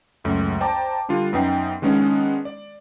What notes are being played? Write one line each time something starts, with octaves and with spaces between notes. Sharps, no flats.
C#2 F#2 A3
C5 D5 G5 A5 A#5 D6
D3 G3 D4 F4
F#2 B3 D#4 G5 C7
D#3 G#3 B3 C#4 D4
D5